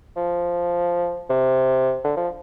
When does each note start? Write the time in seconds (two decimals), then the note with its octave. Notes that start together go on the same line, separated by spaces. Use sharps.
0.17 F3
1.29 C3
2.05 D3
2.17 F3